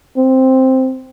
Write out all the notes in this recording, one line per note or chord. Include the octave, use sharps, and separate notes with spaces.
C4